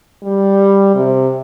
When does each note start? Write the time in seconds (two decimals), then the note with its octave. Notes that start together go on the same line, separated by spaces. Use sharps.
0.23 G3
0.95 C3